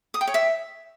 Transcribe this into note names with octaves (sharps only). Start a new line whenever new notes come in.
D#6
G5
C#5
E5